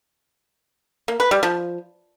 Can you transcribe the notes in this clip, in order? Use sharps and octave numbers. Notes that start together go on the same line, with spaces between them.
A#3
B4
G3
F3